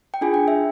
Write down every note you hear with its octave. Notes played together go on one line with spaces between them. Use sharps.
G5
D4 F4 G#4 G#5
G5
E5